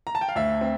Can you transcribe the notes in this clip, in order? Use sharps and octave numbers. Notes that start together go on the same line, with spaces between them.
A#5
A5
G5
F5
D2 E5
C4